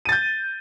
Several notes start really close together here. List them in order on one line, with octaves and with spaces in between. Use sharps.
D#7 A6 G6